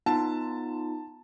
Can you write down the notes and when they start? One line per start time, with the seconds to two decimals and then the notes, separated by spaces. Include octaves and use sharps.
0.06 B3 D#4 F4 A5